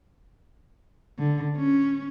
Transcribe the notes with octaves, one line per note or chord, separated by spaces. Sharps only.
D3
C#4